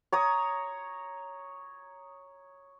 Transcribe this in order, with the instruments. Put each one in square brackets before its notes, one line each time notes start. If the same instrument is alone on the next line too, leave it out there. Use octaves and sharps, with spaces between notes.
[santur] C#5 A#5 D#6